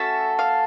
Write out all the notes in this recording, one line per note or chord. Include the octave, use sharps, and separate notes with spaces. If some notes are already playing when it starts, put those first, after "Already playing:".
Already playing: A3 C#4 F#4 A4 E5
F5